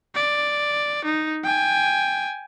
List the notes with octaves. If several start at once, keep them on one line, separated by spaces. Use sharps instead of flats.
D5
D#4
G5 G#5